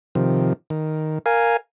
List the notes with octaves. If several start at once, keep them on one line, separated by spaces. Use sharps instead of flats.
C3 D#3 F3
D#3
A#4 F5 G#5